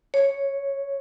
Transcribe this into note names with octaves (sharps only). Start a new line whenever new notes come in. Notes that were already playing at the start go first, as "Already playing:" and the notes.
C#5